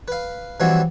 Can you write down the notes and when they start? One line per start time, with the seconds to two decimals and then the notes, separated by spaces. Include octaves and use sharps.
0.08 B4 F5
0.60 E3 F3 G3 C4 F#4 C#5